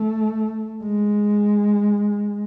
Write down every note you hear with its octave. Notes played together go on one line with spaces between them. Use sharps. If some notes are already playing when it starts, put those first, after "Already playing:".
Already playing: A3
G#3